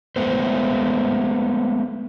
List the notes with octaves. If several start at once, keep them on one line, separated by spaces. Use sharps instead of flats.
G#3 A3 B3 C5